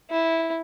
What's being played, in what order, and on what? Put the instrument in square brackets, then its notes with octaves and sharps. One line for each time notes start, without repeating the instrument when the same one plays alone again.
[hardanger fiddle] E4